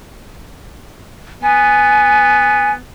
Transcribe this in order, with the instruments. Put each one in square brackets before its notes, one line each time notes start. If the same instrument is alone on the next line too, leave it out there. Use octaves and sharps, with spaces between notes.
[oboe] B3 [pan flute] G#5